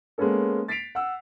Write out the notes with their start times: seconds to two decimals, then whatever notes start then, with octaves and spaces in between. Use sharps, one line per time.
0.18 G#3 A#3 B3 C#4 A4
0.68 A6 B6 C7 D7 F7
0.95 F#5 E6